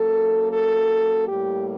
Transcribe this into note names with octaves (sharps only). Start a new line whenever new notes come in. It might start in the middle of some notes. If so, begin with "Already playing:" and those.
Already playing: F#2 F#3 A#3 A4
A4
A2 G3 A#3 G4